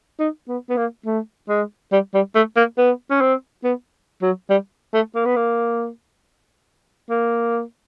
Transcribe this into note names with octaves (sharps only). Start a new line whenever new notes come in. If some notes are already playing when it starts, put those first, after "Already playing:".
D#4
B3
B3
A#3
A3
G#3
G3
G3
A3
A#3
B3
C#4
C4
B3
F#3
G3
A3
A#3
B3
A#3
A#3